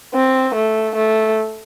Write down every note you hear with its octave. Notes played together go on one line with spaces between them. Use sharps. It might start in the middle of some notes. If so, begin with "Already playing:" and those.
C4
A3
A3